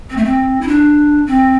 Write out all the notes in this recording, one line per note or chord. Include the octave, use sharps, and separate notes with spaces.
C4
A3
C4
E4
D4
C4